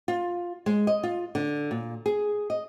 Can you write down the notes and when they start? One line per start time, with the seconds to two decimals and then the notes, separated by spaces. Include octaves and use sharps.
0.08 F4
0.66 G#3
0.87 D#5
1.03 F4
1.35 D3
1.71 A#2
2.06 G#4
2.50 D#5